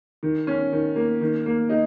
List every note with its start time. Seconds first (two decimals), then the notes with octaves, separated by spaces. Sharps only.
0.23 D#3
0.47 C#4
0.72 D#3
0.96 A#3
1.21 D#3
1.46 A#3
1.69 D#4